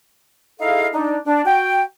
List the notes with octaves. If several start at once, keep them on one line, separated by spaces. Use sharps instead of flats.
D#4 E4 G#4 A4 D#5 F5
D4 D#4
D4
F#4 G5